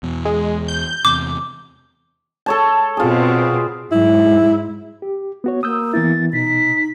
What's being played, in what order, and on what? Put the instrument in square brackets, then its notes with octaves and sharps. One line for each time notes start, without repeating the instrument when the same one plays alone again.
[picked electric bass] E2 B2
[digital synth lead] G#3
G6
[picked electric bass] E2 C3 [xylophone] D6
[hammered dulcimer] A4 C#5 A5
[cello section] B2 C4 [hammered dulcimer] F4 G#4
[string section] G#2 F#3 G#3 [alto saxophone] E4
[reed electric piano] G4
B3 F#4 C#5
[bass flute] A#3 [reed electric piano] D#6 E6 G6
[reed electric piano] E3 B3 E4 [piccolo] A6
[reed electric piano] B2 [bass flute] D#4 [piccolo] B6